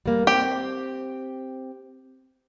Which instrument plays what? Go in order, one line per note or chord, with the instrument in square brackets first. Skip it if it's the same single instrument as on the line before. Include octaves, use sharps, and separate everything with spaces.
[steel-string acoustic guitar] G3 A#3
[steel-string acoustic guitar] C4 [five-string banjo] G4